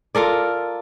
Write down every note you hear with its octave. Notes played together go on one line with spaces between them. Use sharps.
F4 A4 A#4 D5